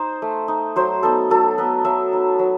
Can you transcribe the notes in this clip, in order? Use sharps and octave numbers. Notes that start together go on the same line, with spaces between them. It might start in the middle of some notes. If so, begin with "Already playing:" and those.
Already playing: D#4 C5
A3
D#4
F#3 C5
B3 D#4 A4
F#3 A4
B3 D#4 B4
F#3 E5
B3 D#4
F#3